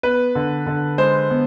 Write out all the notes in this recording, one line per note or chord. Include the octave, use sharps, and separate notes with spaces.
B3 B4
D3
D3
G#3 C5
B3